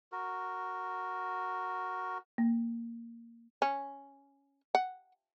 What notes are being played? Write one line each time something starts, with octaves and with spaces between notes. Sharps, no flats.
F#4 A#4
A#3
C#4
F#5